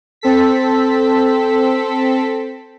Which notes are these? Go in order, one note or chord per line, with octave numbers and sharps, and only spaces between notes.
C4 A4 B6